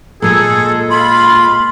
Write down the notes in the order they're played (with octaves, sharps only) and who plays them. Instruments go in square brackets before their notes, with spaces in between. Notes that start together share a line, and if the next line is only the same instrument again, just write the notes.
[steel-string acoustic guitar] A#2 G#3 [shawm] G#4 [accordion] A4
[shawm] F4 [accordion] B5 [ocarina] C6